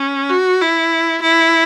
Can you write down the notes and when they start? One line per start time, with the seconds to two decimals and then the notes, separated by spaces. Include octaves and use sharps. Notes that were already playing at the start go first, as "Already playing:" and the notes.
Already playing: C#4
0.30 F#4
0.61 E4
1.23 E4